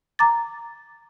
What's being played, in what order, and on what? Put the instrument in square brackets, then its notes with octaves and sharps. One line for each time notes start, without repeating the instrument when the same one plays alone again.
[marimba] A#5 D6 A6